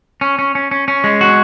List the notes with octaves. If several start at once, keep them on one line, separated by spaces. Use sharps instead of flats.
C#4
C#4
C#4
C#4
C#4
G#3
F#4